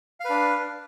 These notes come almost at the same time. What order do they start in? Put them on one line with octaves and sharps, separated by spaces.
F5 B4 D4